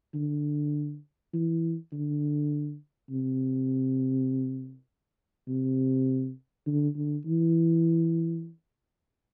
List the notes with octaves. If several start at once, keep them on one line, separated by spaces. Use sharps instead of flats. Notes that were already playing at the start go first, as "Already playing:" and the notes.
D3
E3
D3
C3
C3
D3
D3
E3